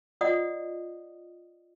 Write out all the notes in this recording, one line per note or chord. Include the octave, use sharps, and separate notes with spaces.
F4 D5 D#5 F#5 D#6